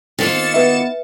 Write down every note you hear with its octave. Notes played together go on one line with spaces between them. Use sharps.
D#3 A#3 C4 F4 A6 C#7 E7
B3 B4 E5